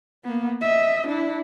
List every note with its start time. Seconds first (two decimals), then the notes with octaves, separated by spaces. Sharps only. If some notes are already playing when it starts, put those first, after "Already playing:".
0.24 A#3 B3
0.61 D#5 E5
1.07 D4 E4